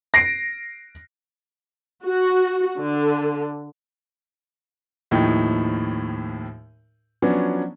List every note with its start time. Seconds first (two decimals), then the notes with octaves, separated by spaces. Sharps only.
0.14 A#6 C7 D7
2.06 F#4
2.79 D3
5.11 D#2 A2 F3 D#4 G5
7.22 F3 F#3 B3 C#4 D4